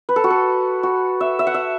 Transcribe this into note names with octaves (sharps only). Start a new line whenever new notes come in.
B4
A4
F#4
A4
F#4
E5
E5
F#5
E5